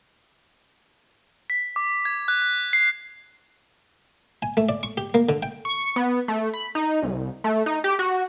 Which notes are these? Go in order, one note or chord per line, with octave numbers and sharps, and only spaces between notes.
B6
D6
G#6
F#6
F#6
C7
G#5
A3
D5
C#6
G4
A#3
D3
G5
C#6
B3
A3
B5
D#4
C2
A3
D#4
G4
F#4